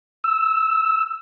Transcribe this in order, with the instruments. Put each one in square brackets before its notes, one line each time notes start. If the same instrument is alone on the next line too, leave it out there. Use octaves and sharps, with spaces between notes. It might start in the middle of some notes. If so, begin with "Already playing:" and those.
[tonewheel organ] E6